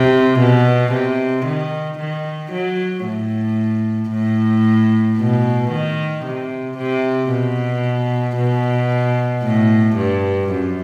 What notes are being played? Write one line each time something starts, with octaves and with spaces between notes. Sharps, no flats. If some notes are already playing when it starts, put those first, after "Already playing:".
Already playing: C3
B2
C3
D#3
D#3
F#3
A2
A2
B2
D#3
C3
C3
B2
B2
A2
G2
F#2